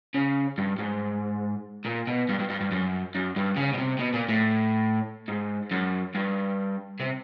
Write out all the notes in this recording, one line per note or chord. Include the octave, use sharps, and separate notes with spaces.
C#3
G2
G#2
A#2
B2
G2
G2
G2
G2
F#2
F#2
G2
C#3
B2
C3
B2
A#2
A2
G#2
F#2
G2
C3